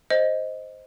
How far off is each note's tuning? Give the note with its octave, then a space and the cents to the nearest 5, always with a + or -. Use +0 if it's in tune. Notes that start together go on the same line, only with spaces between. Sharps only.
C5 +0 D#5 +5